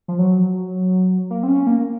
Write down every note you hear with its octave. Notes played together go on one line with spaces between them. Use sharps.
F3
F#3
A#3
C4
C#4
A#3